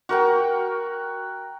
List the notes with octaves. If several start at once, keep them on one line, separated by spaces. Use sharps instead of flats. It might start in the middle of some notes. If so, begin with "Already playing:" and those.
F#4 A#4 G5